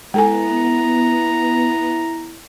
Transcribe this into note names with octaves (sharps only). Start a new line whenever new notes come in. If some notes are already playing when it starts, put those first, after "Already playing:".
G#3 B3 E4 A4 G#5 A#5